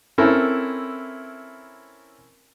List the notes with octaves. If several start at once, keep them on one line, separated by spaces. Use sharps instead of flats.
C4 C#4 E4 A4 A#4